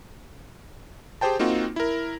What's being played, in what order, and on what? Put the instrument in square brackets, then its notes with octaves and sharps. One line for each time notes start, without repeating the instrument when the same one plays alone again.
[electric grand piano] G4 G#4 C5 G5 A5
A#3 C4 D#4 F4 F#4
E4 A#4